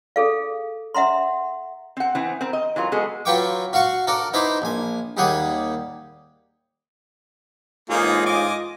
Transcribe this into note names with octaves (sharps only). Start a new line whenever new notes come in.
G#4 A4 F5
E5 F#5 A#5 C6
C4 F#5
E3 B3 C4
C4 A#4
D#5
E3 F#3 F4 A#4
G#3 B3 F#4 G#4 A4
F#3 F4 B4 G5 C#6 D6
F#4 F5 F#5 C#6
A4 A#4 D5 F#5
D#4 E4 B4 C5 A#5 D6
A#1 G#5
D#2 G3 G#4 F#5 D#6
A1 G#2 A#3 D#4 F4 G#4
D#5 G#5 D6